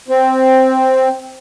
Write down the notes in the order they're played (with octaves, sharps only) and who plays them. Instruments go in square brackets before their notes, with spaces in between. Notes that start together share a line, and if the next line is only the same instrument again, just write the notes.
[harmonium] C4